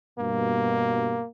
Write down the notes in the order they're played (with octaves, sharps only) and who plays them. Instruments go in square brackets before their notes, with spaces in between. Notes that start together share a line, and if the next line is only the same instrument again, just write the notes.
[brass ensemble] G2 B2 [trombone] A#3